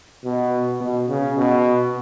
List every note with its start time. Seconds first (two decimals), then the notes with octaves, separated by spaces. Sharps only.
0.24 B2
0.80 B2
1.09 C#3
1.37 B2